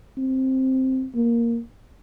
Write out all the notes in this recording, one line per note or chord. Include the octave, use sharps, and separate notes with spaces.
C4
A#3